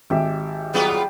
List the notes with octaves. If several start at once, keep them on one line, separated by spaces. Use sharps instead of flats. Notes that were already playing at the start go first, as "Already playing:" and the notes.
G#1 G4 E5
F#3 G3 B3 F4 G#4